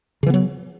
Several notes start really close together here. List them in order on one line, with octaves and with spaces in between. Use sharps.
C#3 E3 B3 F#3